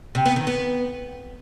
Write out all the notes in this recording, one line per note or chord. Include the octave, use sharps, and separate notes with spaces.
C3
B3
D#3
B3